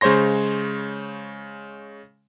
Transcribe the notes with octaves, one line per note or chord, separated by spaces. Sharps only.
C#3 G#3 C5 C#5 C6 A#6